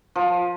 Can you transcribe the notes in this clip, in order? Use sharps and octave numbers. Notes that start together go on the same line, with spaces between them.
F3